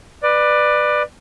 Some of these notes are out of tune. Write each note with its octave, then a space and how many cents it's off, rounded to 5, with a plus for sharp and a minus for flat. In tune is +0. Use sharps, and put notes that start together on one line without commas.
B4 +0 D5 +20